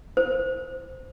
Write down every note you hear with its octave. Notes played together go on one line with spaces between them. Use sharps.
C5